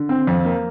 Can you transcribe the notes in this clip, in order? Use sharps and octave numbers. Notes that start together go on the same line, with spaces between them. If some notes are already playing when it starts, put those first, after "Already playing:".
Already playing: D3
C4
F2
A#3